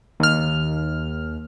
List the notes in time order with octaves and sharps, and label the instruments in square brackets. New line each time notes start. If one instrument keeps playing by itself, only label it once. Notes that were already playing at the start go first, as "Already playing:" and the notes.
[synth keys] D#2 F6